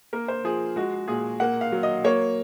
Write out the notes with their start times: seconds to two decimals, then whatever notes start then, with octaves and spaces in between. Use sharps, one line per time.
0.13 A#3 A#4
0.28 C5
0.44 F3 G#4
0.76 G#3 F#4
1.08 A#2 G#4
1.40 A#3 F#5
1.61 F5
1.72 F#3
1.83 D#5
2.04 A#3 C#5